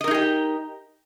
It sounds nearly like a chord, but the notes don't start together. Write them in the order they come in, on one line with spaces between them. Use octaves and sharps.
D#5 A#4 D#4 G#4 G4